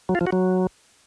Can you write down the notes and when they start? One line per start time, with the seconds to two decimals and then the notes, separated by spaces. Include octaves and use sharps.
0.09 F#3
0.15 F4
0.21 F3
0.27 F#4
0.32 F#3